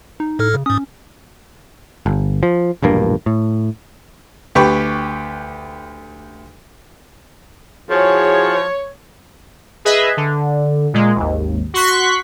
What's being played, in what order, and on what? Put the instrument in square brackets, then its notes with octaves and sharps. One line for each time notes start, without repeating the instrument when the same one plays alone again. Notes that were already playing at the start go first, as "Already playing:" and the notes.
[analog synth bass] D#4
[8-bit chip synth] A2 A4 F6
[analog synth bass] C#3
[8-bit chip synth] G#2 D#6 [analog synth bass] C#4
[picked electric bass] G1
F3
E1 A#1 G2 A#3
A2
[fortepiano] D2 G4 B4 G5 C#6
[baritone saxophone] F3 [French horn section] E4 F#4 G#4 [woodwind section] C#5
[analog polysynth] G#4 B4 D#5 E5
D3
A#2 G#3
G#1 D#2
F#4 C6 C#6 F#6 B6